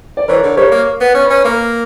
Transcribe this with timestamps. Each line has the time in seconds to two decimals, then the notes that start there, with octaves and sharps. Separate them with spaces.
0.17 D5
0.28 E3 A#4 C#5
0.43 D3
0.57 G3 A#4 C#5
0.72 A#3
1.01 B3
1.15 C#4
1.25 B4
1.30 C#4
1.45 A#3 A#4